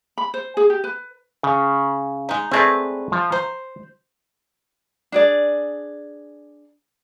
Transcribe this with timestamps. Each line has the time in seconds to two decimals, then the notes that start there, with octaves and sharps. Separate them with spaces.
0.18 B5
0.34 C5
0.57 G#4
0.70 G4
0.84 B4
1.43 C#3
2.29 G#3 D#4
2.51 G#3 A3 C4 G#4 B4 D5
3.12 F3
3.32 C5 A#5
5.12 D4 G#4 D5